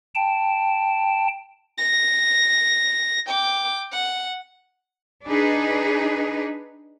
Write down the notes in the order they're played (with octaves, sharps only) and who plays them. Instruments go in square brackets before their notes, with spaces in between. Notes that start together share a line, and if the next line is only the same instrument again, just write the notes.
[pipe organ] G5 A5
[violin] A#6
G5 D6
F#5
[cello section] D4 D#4 G#4 B4